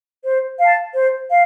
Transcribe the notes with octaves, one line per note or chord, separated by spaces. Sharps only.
C5
F5 A5
C5
F5